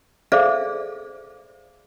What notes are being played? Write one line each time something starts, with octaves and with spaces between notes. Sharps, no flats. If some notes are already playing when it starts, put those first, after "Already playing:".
G#4 A4 C5 D5 E5 F5